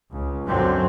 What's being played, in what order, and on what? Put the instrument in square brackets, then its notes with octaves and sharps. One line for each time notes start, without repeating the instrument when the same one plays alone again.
[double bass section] C#2
F#2 D3 F#3 C4